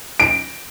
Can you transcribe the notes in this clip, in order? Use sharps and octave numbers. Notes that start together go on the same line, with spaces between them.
D7